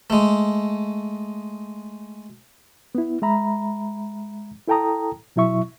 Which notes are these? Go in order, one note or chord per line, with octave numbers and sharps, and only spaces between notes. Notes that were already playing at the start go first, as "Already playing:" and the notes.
G#3 A3
B3 E4
G#3 E5 A#5 B5
E4 A4 G5 A5 A#5 D#6
B2 F#3 E4 E5 C#6